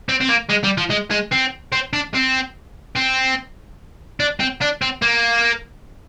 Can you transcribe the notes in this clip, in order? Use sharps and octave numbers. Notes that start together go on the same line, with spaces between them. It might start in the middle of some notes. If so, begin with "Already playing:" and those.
C4
C4
A#3
G#3
G3
F3
G#3
G#3
C4
C4
D4
C4
C4
D4
C4
D4
C4
A#3